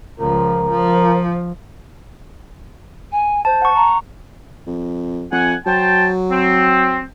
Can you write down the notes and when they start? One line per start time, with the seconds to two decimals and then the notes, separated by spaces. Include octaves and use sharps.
0.20 C#2 F3 A#4
0.69 F3
3.12 G#5
3.45 C5 A5
3.62 F#5 C#6
3.74 A#5
4.67 F2
5.32 F2 F#5 G#5
5.66 F#3 C5 G5 A5
6.31 C4